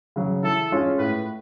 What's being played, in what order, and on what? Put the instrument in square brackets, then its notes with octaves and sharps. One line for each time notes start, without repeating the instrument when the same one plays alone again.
[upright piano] C#3 F#3
[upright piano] E3 [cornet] A4
[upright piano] G#3 C#4 F4
[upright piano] A2 [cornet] B4